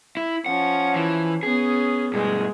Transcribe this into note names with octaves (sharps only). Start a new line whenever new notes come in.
E4
F3 C#4 F#5
E3
B3 C#4 G#4
G2 B2 G#3 G#4